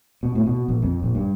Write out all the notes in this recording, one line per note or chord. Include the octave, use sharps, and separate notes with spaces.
B2
A2
B2
A#1
F2
A#1
G2